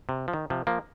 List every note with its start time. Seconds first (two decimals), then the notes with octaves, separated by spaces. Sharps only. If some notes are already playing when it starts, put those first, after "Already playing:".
0.09 C3
0.28 F3
0.33 D#3
0.50 C3 F3
0.67 F3 A#3